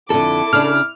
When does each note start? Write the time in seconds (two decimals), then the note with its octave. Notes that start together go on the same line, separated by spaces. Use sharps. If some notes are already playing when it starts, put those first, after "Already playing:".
0.10 F2 D3 E4 A4 D6
0.53 C#3 D4 F6